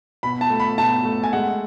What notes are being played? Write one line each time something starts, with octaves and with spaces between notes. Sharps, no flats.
B2 B5
A5
A3
B5
B2 A5
A3
G#5
G#3 F#5